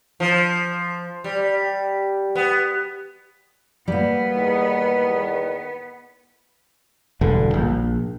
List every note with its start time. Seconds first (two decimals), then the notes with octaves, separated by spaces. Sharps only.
0.20 F3
1.24 G3
2.35 B3
3.88 G3 A#3 B3
4.36 E2 D#3
7.21 E1 G2 D3
7.54 A#1